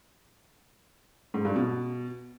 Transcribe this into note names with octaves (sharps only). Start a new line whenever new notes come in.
G#2
G2
B2